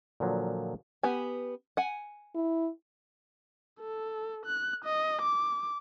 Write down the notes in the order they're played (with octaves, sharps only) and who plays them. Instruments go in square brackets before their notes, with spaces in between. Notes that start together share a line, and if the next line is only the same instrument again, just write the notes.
[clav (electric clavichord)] A#2 D3 F3 F#3
[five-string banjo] B3 G4 G#5
F#5 G#5
[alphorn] E4
[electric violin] A4
F#6
D#5
D6